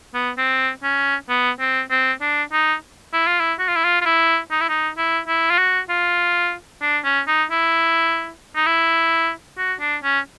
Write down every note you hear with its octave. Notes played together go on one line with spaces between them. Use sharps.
B3
C4
C#4
B3
C4
C4
D4
D#4
E4
F4
E4
F#4
F4
E4
F4
F4
E4
D#4
E4
D#4
E4
E4
F4
F#4
F4
D4
C#4
D#4
E4
D#4
E4
F#4
D4
C#4